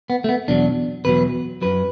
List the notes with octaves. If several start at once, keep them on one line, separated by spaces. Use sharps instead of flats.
B3
A3
B3
E2 B2 F#3 D4
E2 B2 F#3 B4
F#2 F#3 B4